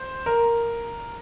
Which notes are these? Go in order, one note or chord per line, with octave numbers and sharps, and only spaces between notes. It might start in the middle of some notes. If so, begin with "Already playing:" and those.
Already playing: C5
A#4